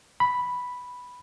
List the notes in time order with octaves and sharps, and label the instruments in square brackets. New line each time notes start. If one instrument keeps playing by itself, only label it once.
[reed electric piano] B5